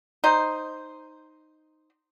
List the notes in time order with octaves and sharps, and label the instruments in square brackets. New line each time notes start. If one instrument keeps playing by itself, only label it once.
[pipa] D#4 C5